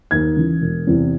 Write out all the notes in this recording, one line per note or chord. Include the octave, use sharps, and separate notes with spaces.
D#2 G#6
C#3 E3
E1
E2 C3 E3